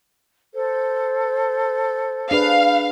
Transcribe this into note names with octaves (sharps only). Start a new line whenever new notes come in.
A4 C5
D4 G#4 B4 F5